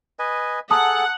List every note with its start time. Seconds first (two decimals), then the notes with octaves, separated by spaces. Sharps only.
0.19 B4 D#5 G#5
0.71 G#4 A4 F#5 A5 A#5 D#6